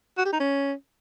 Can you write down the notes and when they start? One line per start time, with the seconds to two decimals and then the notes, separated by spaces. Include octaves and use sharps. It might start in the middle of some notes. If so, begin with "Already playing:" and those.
0.18 F#4
0.25 G4
0.33 D#4
0.40 C#4